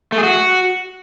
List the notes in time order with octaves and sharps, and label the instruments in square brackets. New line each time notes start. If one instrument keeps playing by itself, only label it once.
[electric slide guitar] A3
G#4
F#4